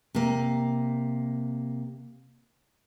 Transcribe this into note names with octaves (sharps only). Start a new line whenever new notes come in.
C3 A#3